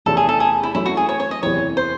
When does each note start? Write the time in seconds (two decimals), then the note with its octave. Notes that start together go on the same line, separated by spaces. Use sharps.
0.06 E2 C3 E3 A3 C#4 A4
0.17 G#4
0.29 A4
0.40 G#4
0.63 E4
0.75 F#2 E3 A3 C#4 E4
0.86 F#4
0.97 G#4
1.09 C#5
1.20 C#5
1.31 D#5
1.42 F#1 E2 C3 E3 C4 C#5
1.77 C5